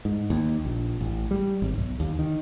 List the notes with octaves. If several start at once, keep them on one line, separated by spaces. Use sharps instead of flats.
G#2
D#2
A#1
A1
G3
G#1
B1
D#2
D#3